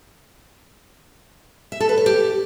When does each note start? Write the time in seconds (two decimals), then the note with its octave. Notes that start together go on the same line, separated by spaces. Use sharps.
1.72 E5
1.80 A4
1.89 B4
1.98 C#5
2.06 G4